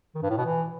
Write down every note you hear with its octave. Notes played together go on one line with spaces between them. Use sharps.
D#3
G2
A2
B2
E3